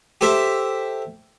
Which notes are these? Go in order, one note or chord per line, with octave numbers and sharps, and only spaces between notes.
G4 A4 C5 E5